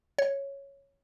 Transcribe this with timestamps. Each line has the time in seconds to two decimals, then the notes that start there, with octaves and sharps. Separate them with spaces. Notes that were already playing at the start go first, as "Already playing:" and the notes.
0.18 C#5